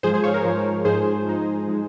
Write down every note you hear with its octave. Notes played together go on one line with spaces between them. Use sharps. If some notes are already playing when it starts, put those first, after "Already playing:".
G#2 F3 G#3 G#4 C5
G#4 C5
C#5 F5
A#4
G#2 F3 G#3
G#2 F3 G#3 D#4 G#4 C5
G#2 F3 G#3 D#4
F3 G#3